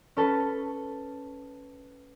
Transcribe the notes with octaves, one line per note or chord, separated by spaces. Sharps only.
C#4 A4 B4